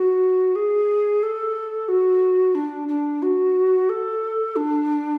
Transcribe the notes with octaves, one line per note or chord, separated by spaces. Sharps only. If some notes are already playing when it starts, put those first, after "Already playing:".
Already playing: F#4
G#4
A4
F#4
D4
D4
F#4
A4
D4